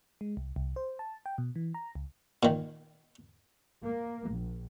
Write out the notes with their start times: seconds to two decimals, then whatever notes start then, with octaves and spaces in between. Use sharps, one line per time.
0.21 G#3
0.37 C2
0.56 C2
0.76 C5
0.99 A5
1.26 G5
1.38 B2
1.56 E3
1.74 A#5
1.95 C#2
2.43 A#2 D#3
3.84 A#3
4.31 A#1